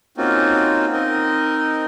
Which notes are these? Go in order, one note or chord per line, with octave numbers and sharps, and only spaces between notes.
A#3 C4 C#4 D#4 F4 F#4
C4 D#4 A#4 D#5